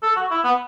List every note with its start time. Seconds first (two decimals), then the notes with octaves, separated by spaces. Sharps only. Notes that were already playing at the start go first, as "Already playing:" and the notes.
0.03 A4
0.16 F#4
0.31 E4
0.44 B3